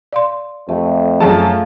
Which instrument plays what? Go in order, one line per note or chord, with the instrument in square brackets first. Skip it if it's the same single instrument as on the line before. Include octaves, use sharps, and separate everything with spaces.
[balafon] D5 F5 C6
[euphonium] F2 [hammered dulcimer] A3
[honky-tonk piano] F#2 F3 A5 [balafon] F4 G#4 [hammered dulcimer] F5